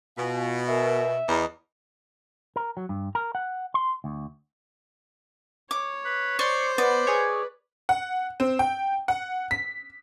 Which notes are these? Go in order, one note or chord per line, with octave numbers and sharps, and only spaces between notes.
B2 F4 F5 G#5
A#4 E5 G#5
E2 D#5 A#5 D#6
A#4
F#3
G2
A#4
F#5
C6
D2
C#5 D6
B4
C5 D5 C6 C#6
B3 B4 D5
G#4 C#5
F#5
C4
G5
F#5
B6